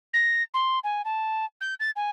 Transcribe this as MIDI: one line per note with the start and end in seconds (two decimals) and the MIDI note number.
0.14 0.43 94
0.54 0.79 84
0.84 1.02 80
1.05 1.45 81
1.61 1.74 91
1.80 1.91 93
1.96 2.10 80